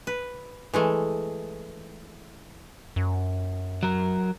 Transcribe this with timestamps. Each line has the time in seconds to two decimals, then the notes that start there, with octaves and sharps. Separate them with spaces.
0.07 B4
0.74 E3 G#3 A3
2.96 F#2
3.83 F#3 A#4